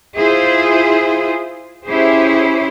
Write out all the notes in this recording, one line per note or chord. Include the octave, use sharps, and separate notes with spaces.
E4 F4 G#4 C5
C#4 E4 G4 G#4 C5